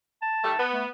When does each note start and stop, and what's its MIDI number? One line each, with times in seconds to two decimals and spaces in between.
0.22 0.62 81
0.44 0.54 51
0.44 0.54 55
0.44 0.54 57
0.59 0.88 59
0.73 0.85 57